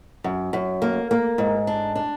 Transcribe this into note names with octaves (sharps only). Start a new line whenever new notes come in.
F#2
F#2
A#3
A#3
G#2
D4
D4